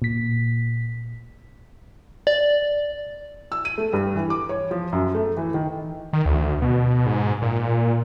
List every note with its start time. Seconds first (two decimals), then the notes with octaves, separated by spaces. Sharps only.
0.02 A#2 B6
2.27 D5
3.52 E6
3.65 D#7
3.78 A3
3.93 G2
4.16 E3
4.30 D6
4.49 C#5
4.71 F3
4.92 F#2
5.15 A3
5.37 E3
5.54 D#3
6.13 D#3
6.25 D2
6.62 B2
7.06 G#2
7.42 A#2
7.59 A#2